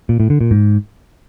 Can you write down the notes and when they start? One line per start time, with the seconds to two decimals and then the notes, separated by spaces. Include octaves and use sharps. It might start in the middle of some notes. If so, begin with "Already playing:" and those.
0.09 A#2
0.20 A2
0.30 D3
0.41 A#2
0.51 G#2